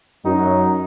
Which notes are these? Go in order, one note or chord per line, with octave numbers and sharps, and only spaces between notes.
F#2 F#3 D#4